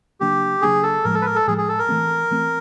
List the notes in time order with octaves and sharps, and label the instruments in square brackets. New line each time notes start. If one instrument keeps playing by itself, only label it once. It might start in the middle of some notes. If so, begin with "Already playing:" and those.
[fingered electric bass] C#3 F#3 A#3 D4 [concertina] G4
[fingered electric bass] C#3 F#3 A#3 D4 [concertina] G#4
[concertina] A4
[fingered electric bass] A2 F3 G#3 [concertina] A#4
[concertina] A4
B4
A#4
A4
[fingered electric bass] A2 F3 G#3 [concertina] G#4
[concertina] G#4
A4
A#4
[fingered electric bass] E3 A3 C4
E3 A3 C4